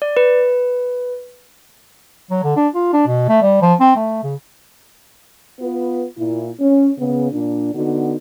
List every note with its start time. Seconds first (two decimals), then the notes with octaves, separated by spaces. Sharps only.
0.02 D5
0.17 B4
2.31 F#3
2.44 D3
2.56 D4
2.74 F4
2.93 D4
3.07 B2
3.29 A3
3.42 G3
3.62 F3
3.80 C4
3.96 A3
4.23 C#3
5.60 B3 F4 B4
6.18 A#2 E4
6.60 C#4
6.99 C#3 B3
7.32 A#2 D4
7.74 D3 B3 D#4 F#4